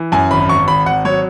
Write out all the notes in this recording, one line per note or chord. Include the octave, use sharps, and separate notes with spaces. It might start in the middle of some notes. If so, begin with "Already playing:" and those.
Already playing: E3
F#2 G#5
G#1 B5
G#1 C#6
G#1 B5
G#1 F#5
F#3 C#5